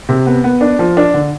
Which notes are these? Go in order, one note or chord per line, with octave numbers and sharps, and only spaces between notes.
C3
B3
B3
D4
F3
D4
D3